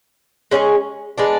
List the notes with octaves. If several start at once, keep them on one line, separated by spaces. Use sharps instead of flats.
G#3 C#4 G#4 C#5
G#3 B3 D4